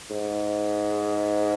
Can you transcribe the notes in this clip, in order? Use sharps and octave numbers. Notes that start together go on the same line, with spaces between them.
G#2